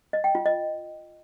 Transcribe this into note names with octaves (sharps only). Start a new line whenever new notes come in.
D#5
G5
F4
D#5